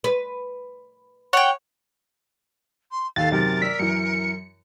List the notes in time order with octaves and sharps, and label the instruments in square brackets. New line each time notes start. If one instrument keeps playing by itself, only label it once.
[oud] B4
[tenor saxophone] C#5 [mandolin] F#5 G5
[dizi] C6
[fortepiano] D#2 A4 [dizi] F5 [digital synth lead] A6
[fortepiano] F#2 C3 D#3 [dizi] A#4
[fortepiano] D5 E6 [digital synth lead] B6
[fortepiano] F#2 E3 [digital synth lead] C#7